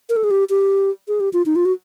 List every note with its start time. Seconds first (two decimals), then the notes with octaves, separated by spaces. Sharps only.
0.09 A#4
0.16 A4
0.24 G#4
0.31 G4
0.50 G4
1.08 G#4
1.20 G4
1.33 F4
1.46 D#4
1.56 F4
1.65 F#4